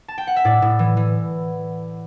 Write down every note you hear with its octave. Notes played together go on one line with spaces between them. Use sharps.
A5
G5
F#5
E5
A2 D5
A2
E3
E3